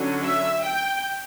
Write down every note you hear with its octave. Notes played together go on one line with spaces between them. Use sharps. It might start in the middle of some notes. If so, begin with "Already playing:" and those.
Already playing: D3 F#3 C#4
E5
G5